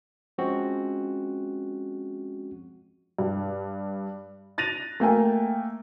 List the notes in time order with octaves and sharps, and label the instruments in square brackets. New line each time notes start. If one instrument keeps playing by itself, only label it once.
[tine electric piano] F3 G#3 C4 C#4 F#4
[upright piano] G2
F#6 A6 A#6 D#7 F7
A3 A#3 G5 G#5